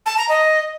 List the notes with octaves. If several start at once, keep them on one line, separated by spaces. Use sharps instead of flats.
A5
A#5
D#5